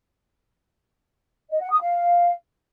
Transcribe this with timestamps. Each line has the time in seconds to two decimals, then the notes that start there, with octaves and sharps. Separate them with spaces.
1.50 D#5
1.61 F#5
1.71 D#6
1.81 F5